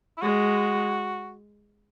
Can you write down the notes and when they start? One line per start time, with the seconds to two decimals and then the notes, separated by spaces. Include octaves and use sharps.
0.18 E4
0.21 G#3 F#4